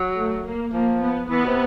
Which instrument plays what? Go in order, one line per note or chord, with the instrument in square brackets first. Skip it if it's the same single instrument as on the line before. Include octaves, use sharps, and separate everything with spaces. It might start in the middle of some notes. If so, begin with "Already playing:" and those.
Already playing: [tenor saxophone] F#3
[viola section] A3
A#3
[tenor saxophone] F3 [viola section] A#3
[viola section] B3
[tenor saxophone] E3 [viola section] B3
[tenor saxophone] B2
C3